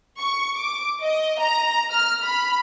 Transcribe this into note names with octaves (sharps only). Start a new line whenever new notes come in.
C#6
D6
D#5
A#5
F6
B5